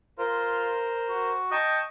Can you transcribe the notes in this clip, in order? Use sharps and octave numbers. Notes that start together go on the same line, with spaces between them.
F4 A#4 C5
F#4
D#5 G5 A5 C#6